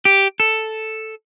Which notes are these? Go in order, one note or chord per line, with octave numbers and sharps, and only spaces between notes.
G4
A4